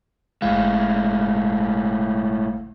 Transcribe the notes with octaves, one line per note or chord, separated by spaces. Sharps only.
G1 A2 G#3 F5